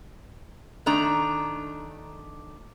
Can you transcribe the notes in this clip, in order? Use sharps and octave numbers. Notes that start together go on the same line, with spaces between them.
D#3 A3 D4 A#5